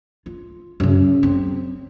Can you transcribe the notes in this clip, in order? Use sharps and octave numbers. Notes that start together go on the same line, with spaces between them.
F4
F#2 C#3
C4